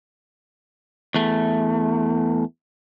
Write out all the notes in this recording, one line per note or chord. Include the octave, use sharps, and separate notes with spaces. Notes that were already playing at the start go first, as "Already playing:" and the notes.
E2 A3